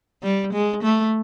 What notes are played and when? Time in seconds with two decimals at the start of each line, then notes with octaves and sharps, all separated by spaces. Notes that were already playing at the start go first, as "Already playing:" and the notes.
0.23 G3
0.53 G#3
0.83 A3